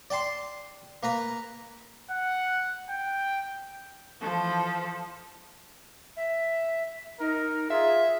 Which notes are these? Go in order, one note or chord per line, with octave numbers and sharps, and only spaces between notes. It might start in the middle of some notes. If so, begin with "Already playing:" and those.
D5 G5 A5 C6
A#3 B4 A#5 B5
F#5
G5
E3 F3 A4
E5
D#4 A#4
F4 G#4 E5